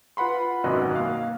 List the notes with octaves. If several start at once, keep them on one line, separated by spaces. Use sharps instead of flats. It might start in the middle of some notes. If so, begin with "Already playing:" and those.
F4 B4 F#5 B5 C6
G#1 F#2 B2 D#5 F#6
A#3 F5